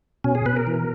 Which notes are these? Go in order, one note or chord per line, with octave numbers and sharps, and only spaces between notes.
B2 C#4
G#4
B2 B4
A#4
E3